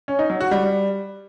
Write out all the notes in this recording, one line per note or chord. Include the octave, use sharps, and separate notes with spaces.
C#4
D#4
F#3
F#4
G3